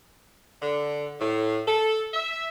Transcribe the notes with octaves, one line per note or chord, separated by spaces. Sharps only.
D3
A2
A4
E5